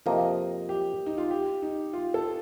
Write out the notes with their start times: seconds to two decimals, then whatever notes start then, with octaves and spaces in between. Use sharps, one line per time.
0.06 F2 C3 F3 A#3 D#5
0.69 G4
1.06 D#4
1.18 F4
1.31 G4
1.62 D#4
1.93 F4
2.14 A4